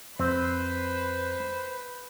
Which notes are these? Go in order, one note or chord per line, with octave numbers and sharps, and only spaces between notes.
F2 C4 B4 C5